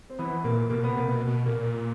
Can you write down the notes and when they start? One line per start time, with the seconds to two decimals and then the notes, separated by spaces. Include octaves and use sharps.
0.10 C4
0.19 E3 B3
0.44 A#2 A#3
0.70 B2 A#3
0.84 B3
0.89 C3
0.97 A#3
1.08 B2
1.27 B2
1.46 A#2 A#3